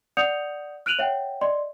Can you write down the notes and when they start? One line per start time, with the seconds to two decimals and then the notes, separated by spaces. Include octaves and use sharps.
0.17 D5 F#5 D#6 G6 C#7 F7
0.86 F6 F#6 D7 D#7 F7 F#7
0.99 C#5 E5 F#5 G5
1.41 D5 D#5 C6